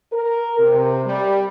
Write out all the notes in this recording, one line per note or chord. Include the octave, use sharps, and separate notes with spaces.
A#4
C3
G3